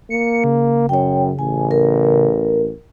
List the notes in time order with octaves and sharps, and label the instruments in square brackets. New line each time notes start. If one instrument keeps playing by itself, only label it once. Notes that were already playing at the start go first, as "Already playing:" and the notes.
[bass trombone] A#3 [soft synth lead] C#7
[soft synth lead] C#3
[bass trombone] F#2 [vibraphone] C#5 G5
[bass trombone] A1 [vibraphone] G#5
[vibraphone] A#4